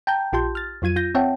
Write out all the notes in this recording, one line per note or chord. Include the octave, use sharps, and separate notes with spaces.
G5 A5 A#5 G6
A#1 F4 G4 A5 C6 G6
F6 A6
F2 F#3 F4 G#6 D#7
F4 G6 A#6
C4 C#5 E5 F#5 G5 A5